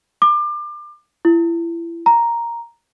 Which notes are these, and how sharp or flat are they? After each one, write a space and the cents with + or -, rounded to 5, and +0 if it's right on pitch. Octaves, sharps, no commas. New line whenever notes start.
D6 +30
E4 +30
A#5 +0